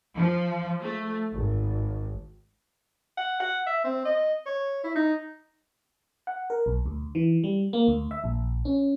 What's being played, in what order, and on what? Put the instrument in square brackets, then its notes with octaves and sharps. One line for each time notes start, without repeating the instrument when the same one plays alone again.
[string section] F3
A3
G#1
[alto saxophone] F#5
F#5
E5
C4
D#5
C#5
E4
D#4
[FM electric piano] F#5
A#4
B1
D2
E3
G3
A#3
D2
E5
A#1
C#4